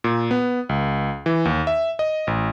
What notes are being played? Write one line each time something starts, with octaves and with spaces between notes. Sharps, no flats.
A#2
B3
C#2
E3
D#2
E5
D#5
A1